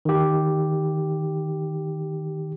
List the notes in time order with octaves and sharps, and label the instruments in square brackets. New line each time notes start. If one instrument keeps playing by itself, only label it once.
[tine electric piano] D#3 G4